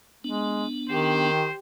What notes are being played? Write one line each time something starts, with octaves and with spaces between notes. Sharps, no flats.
G#3 B3 D4
D#3 G4 C5